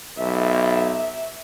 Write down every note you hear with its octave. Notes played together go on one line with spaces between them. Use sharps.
B1 E5